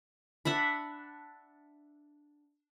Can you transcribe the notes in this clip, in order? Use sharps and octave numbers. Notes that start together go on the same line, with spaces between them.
D4 E5 F#5 B5